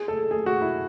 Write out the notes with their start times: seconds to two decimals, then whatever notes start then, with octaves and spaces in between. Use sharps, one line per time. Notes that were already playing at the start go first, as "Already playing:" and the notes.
Already playing: G#4
0.08 A4
0.31 G#4
0.46 F#4
0.62 E4